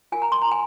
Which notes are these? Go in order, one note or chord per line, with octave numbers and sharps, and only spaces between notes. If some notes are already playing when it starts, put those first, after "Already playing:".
F4 A#4 G#5
A#5
C6
A#5
G#5